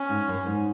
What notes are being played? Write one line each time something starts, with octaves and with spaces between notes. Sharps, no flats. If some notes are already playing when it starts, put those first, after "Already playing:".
Already playing: C#4
G#2
F#2
G#2